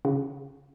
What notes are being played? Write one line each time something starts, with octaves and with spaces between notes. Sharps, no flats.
C#3